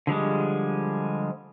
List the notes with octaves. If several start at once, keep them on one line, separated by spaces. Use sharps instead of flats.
D3 F3 G3 G#3